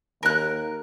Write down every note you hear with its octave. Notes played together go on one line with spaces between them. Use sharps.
D#2 A#4 F#6